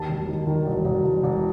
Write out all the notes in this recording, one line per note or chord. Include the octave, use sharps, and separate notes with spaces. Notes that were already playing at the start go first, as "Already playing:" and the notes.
Already playing: D#2 A5
E1
D#3
D#3
E1
E1
E1
E1